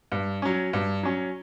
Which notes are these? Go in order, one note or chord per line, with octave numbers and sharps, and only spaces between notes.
G2
F#3 C#4
G2
F#3 C#4